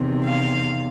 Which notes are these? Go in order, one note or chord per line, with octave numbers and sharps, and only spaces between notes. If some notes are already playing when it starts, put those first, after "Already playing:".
Already playing: E2 C3 D#3
F5